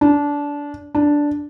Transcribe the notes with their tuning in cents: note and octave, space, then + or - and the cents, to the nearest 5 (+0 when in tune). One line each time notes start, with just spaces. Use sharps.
D4 -20
D4 -5